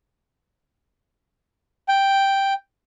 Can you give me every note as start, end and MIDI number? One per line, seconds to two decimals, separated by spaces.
1.88 2.54 79